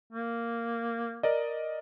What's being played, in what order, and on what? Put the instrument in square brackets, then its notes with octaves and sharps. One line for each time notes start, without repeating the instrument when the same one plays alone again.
[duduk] A#3
[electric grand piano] A#4 D5 D#5